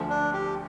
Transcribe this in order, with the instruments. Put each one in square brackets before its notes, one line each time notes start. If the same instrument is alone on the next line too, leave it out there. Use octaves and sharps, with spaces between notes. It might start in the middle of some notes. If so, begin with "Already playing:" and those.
Already playing: [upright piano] D2 D3 F3 A3
[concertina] D4
G4